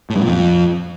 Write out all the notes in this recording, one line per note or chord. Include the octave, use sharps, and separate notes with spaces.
A2
G2
A#2
F2